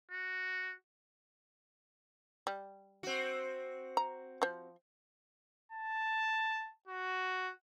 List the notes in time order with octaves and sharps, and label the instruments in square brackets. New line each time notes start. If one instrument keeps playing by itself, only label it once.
[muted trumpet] F#4
[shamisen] G3
[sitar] C4 F#4
[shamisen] A#5
F3 C5
[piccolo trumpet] A5
F#4